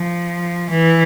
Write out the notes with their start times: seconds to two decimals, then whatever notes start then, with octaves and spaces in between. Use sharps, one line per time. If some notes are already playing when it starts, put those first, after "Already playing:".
Already playing: F3
0.70 E3